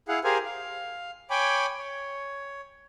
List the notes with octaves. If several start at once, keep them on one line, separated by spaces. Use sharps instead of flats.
E4 G#4 F5 F#5
G4 G#4 A#4 C5 F5 G#5
F5
C#5 G5 G#5 B5 D6
C#5